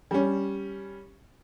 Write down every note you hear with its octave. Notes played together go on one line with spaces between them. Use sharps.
G3 C#4